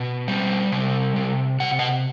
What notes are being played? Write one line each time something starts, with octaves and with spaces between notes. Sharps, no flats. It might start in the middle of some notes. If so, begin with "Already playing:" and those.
Already playing: B2
G3
C3
C3
C3 F#5
D#5 F#5